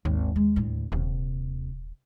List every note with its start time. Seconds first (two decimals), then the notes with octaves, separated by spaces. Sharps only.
0.05 G#1 D#2
0.36 G#3
0.56 D2 A2
0.92 D#1 D#2 C3